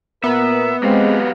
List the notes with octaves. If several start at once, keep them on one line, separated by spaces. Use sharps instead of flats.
A#2 B3 A#4 E5
F#3 G#3 C4 G4 F5